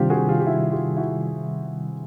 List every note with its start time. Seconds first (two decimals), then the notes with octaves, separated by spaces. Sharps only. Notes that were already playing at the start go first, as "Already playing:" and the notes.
Already playing: C3 D#3 G3 C4 D4 F4 G4
0.10 F#4 G#4
0.28 F4 G4
0.40 G4
0.47 E4 F#4
0.72 F4 G4
0.97 E4 F#4